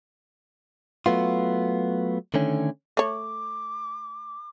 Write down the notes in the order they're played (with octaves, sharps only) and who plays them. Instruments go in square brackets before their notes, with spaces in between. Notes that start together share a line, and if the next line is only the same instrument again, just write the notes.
[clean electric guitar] F#3 A3 B3 F4
D3 D#3 A3 C#4
[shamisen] A3 C#5 [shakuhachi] D6